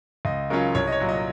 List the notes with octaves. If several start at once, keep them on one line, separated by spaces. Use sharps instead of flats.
C#2 D#5
C#3 F#3 C#4 F4 A#4
C2 C#5
D#5
C#5
A#2 F#3
D#5